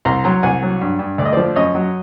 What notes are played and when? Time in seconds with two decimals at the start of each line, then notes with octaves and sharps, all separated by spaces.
0.05 C2 A#5 C6
0.24 F#3 A#5 C6
0.43 C2 F#5 G#5
0.63 F#3
0.81 G2
0.99 G2
1.18 D2 D5
1.25 D#5
1.33 F3 C5 D5
1.56 F#2 C#5 D#5
1.75 F#3